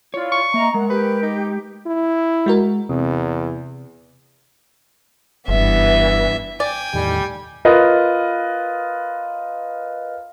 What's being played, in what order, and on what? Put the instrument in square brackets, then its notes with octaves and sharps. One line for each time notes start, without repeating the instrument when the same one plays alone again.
[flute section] E4 F4 [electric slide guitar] C#5 D5
[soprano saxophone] C#6
[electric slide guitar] A#3 [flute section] D#5 A#5 [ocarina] E5
[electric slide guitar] G#3 [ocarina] A#4 [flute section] F#5
[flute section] G4 [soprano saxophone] B4
[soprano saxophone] D#4
[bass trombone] E4
[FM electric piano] G#3 F#4 A#4
[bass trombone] E2 [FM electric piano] C3
[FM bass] F#1 [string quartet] G2 E3 B3 [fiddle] E5
[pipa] D5 [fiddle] G5 G#5
[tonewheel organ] E2 A2 D#3 [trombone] G3
[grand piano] F4 A#4 B4 D#5